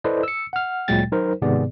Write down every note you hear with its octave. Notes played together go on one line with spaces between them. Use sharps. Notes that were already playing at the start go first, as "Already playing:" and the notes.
E4 A4 B4 C5 D5 D#5
E6 C#7
F#5 F6
D2 A#2 F#3 G#3 G5 A6
F#3 D#4 A#4 C5
G#2 C3 D#3 B3 G#4 D5